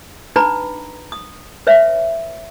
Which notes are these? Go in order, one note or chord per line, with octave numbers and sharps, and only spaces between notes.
D4 D#4 B4 A#5 B5
D#6
B4 C#5 E5